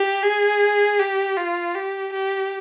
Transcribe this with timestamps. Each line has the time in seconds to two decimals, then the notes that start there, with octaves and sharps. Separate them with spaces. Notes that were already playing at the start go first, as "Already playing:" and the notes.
Already playing: G4
0.23 G#4
0.99 G4
1.38 F4
1.75 G4
2.13 G4